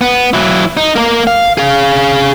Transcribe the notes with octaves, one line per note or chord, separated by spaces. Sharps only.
B3
F#3 E4
D#4
A#3 A#4
F5
G#4 F5